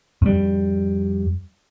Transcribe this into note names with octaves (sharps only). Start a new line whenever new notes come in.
F2 G3